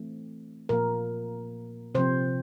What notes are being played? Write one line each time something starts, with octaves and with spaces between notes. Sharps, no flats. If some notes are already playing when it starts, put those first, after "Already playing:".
Already playing: E3 A3 C4
A#2 F3 A#3 A#4
C3 F3 C4 C5